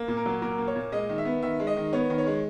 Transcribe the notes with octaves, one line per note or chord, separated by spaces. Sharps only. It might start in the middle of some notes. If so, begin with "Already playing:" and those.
Already playing: A#3
A#2
A#4
F#3
A#2 A#4
A#3
C#5
A#2
G#3 D#5
D#3
E5
B3
D#3 E5
G#3
D#5
D#3
B3 C#5
D#3
C#5
G#3